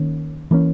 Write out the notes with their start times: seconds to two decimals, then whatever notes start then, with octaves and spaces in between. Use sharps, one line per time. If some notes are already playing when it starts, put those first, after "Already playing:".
Already playing: D#3 A#3 C#4
0.51 E3 A#3 C#4